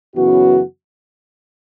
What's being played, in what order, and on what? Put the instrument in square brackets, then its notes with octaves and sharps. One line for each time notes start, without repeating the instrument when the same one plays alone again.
[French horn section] F#2 C#3 E3 B3 F#4